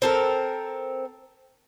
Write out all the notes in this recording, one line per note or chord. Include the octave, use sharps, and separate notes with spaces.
C4 A4 A#4